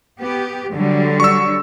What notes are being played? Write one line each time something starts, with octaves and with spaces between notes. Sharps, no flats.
B3 G4
D3 F#3 G3
C#6 E6